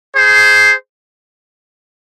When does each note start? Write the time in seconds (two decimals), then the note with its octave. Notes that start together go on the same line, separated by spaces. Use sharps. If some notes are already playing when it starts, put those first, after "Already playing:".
0.17 G#4 C5